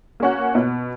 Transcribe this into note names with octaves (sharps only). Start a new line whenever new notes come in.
A#3 C#4 F#4
B2